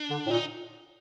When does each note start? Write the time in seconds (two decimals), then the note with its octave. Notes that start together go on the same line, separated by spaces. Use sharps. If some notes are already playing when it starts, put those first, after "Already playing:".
Already playing: D4
0.10 D3
0.26 A2
0.31 A#2 D#4